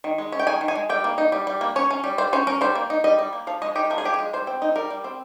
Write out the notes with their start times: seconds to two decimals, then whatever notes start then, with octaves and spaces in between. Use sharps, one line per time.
0.04 D#3
0.18 G#3
0.32 C#4
0.39 G5
0.47 D#3 G#5
0.61 D#3
0.68 G#5
0.76 G#3
0.89 G3 G5
1.04 A#3
1.18 D#4
1.32 G3
1.47 G3
1.61 A#3
1.76 C#4 C#5
1.91 C#4
2.04 G3
2.18 G3 C5
2.33 C#4 C5
2.47 C#4 A#4
2.61 G3 C5
2.75 A#3
2.90 D#4
3.04 G3 D#5
3.19 G3
3.33 A#3
3.47 F3 F5
3.62 G#3 D#5
3.76 D#4 G4
3.90 F3 A#4
3.98 G#4
4.04 F3 G4
4.14 G#4
4.19 G#3
4.33 G3 C5
4.47 C4
4.62 D#4
4.76 G3 A#4
4.91 G3
5.04 C4